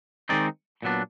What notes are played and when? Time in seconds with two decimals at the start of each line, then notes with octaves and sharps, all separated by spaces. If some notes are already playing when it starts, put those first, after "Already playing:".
0.29 D#3 G#3 C4 D#4 D5
0.82 A#2 F#3 B3 D4